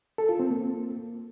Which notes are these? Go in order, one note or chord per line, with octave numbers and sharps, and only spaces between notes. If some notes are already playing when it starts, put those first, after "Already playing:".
A4
F4
C4
A#3